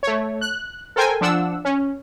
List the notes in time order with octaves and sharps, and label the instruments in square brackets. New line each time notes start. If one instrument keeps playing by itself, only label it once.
[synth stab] A3 C#5
F#6
A4 A#4 C5 G5 G#5
F3 D4 F#5 E6
C#4